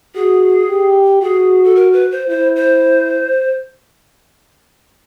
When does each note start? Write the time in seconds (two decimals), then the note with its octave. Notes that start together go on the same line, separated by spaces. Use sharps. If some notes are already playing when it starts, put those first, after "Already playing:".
0.15 F#4 G#4
0.69 G4
1.22 F#4 G#4
1.64 A4
1.75 A#4
1.93 B4
2.11 C5
2.29 E4 C5
2.56 C5